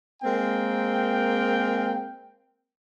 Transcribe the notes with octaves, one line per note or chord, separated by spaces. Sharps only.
G#3 A#3 C4 A#4 G5